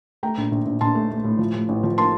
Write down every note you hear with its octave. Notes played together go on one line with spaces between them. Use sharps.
A3 G5 A#5
A#1
A#1
A#1
A#1 A5 C6
A3
A3
A2
F3
A2
A1
F3
A#3 A5 C6